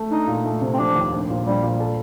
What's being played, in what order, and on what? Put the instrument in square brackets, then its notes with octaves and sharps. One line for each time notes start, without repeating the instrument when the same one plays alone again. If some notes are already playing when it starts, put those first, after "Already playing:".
Already playing: [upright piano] A3
[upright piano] D4 [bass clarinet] D#4
[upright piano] A#2
A3
C3
[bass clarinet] C4
[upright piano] F3 [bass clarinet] D4
[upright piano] D#2
A#1
A#2
[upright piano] A#1 [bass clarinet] G3
[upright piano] A#2
A4